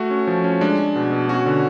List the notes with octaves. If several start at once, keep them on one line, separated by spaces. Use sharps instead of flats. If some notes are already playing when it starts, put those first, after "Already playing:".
Already playing: A3 F#4
C#4
F3
C#4
G#3 D4
G#3
B2
B2
C#4 F#4
D3